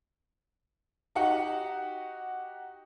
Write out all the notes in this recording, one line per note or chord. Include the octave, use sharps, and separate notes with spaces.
D#4 F#4 G4 F#5